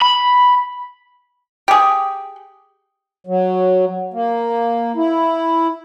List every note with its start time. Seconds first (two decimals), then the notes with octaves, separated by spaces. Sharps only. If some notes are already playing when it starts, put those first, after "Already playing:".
0.01 B5
1.68 G4 G#4
3.27 F#3
4.14 A#3
4.96 E4